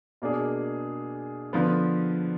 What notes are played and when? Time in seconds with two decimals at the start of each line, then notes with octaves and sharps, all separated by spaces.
0.22 B2 A#3 D4 G#4
1.53 D3 F3 B3